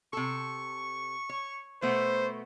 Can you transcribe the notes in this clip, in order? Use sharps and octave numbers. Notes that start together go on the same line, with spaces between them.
C3 A4 C#6
C#5
B2 A3 B3 C5